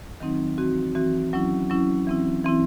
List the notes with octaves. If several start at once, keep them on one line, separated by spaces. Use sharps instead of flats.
D#3 F#3 C4 D#4
E3 C4 F#4
E3 C4 F#4
F#3 C#4 E4
F#3 C#4 E4
E3 C4 E4
E3 C4 E4